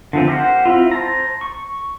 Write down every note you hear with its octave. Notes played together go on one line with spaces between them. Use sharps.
D3 E3 F3 C4
G4 A#4 C5 F#5
C4 E4 F4
C5 A5 A#5
C#6